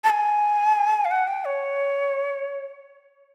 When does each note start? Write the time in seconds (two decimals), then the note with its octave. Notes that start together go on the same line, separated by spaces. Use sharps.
0.04 A5
0.10 G#5
1.05 F5
1.11 F#5
1.27 G5
1.45 C#5